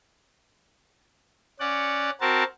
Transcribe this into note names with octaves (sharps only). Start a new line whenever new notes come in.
C#4 D5 F#5
C4 F#4 A#4 A5